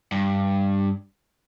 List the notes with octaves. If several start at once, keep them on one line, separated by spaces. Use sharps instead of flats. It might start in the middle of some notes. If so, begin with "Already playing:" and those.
G2